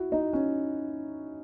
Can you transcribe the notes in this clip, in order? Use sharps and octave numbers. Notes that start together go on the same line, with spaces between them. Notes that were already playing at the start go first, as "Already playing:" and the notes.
Already playing: E4 F#4
D#4
C#4